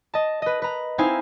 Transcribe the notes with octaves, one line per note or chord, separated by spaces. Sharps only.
D#5 A5
B4 D#5
B4 A#5
C4 D#4 E4 C5 F5 G#5